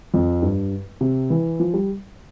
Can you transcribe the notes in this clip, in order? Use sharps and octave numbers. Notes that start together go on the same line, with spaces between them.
F2
G2
C3
E3
F3
G3